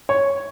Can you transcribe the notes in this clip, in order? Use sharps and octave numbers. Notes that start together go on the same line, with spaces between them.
C#5